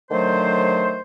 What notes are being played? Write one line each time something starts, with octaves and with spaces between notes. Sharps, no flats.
D3 D#3 F#3 A3 C5